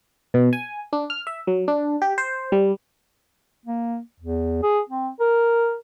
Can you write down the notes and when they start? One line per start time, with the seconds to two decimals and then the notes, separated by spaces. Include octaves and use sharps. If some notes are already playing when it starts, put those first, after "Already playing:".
0.34 B2
0.53 G#5
0.93 D4
1.10 F6
1.27 E5
1.47 F#3
1.68 D4
2.02 G4
2.18 C5
2.52 G3
3.65 A#3
4.20 E2
4.63 G#4
4.89 C4
5.20 A#4